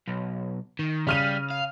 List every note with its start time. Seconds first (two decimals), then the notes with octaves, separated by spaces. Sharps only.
0.08 B1
0.79 D#3
1.07 C#3 G3 F6 D#7
1.51 F5